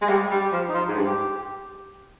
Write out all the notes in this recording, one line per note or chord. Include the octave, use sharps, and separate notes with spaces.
G#3
G3 G4
G3
G4
F3
D#4
F3 F4
G#2
G2
G4